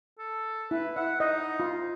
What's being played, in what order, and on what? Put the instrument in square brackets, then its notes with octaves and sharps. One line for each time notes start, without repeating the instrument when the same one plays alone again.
[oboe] A4
[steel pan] E4 [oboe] B4
[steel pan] E5 [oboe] F#5
[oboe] D#4 [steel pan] D#5
[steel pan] F4